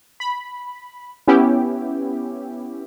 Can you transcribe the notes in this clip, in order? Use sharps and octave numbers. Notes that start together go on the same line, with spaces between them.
B5
B3 C#4 E4 G4